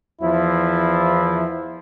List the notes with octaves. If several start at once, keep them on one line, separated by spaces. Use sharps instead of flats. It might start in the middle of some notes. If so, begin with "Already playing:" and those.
E2 F3 E4